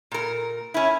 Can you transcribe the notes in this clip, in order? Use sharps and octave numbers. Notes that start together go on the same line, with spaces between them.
A#2 A#4
C#4 E4